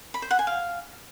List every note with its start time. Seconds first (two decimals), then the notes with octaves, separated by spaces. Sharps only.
0.14 B5
0.22 C5
0.31 F#5
0.39 G#5
0.47 F5